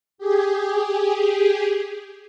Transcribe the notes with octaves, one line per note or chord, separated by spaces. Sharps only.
G4 G#4